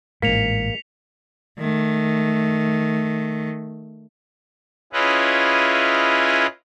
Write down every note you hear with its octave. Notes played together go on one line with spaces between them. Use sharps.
A1 G#2 A#3 B6 C#7 F7
D#3 A3
C#4 E4 F4 G#4 B4 D#5